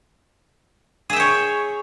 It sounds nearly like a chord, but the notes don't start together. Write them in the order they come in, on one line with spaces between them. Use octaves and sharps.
G#4 E5 G5 C#5